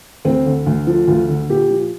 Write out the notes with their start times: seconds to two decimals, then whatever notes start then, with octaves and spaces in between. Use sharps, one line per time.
0.25 D2 C4
0.46 D3
0.66 D2
0.87 F3
1.08 D2 F4
1.29 D3
1.49 A#2 G4
1.71 F3